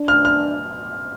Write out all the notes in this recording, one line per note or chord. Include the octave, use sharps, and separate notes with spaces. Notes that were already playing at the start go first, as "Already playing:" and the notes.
Already playing: D4
F6
F6